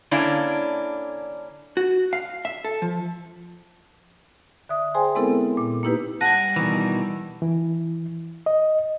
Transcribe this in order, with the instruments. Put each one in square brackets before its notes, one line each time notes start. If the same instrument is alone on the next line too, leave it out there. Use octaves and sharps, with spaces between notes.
[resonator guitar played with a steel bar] D3 A#3 C#4 D4 E4
[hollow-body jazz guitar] F#4
F5
E5
A4
F3
[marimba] D3 E5 D#6
G#4 C5 G5 G#5 C6
G#3 B3 C4 E4 A4 A#4
A#2
A#3 D#4 E4 G4 B4
[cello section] G3 [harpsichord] F#5 G#5 [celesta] A5 A#6 D#7
[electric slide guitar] B2 D#3 E3
[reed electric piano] E3
D#5